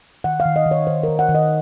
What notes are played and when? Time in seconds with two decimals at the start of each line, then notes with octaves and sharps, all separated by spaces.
0.24 D#3 F#5
0.40 F5
0.45 D#3
0.56 D#5
0.66 D#3 C#5
0.87 D#3 C5
1.03 A#4
1.09 D#3
1.19 F#5
1.29 D#3
1.35 D#5